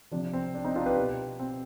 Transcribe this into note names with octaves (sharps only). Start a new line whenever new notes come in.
C3 F3 D4
C4
D4
C4 D#4
D4 F4
G4 B4
B2
C4